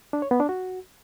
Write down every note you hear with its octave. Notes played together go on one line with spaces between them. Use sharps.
D4
C#5
B3
D4
F#4